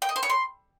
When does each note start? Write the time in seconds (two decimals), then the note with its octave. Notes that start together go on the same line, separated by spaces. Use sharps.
0.02 G5
0.09 D#5
0.16 C5
0.23 C#5
0.30 C6